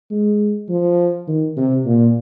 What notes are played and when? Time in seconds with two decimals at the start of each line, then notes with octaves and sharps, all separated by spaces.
0.11 G#3
0.69 F3
1.28 D#3
1.57 C3
1.86 A#2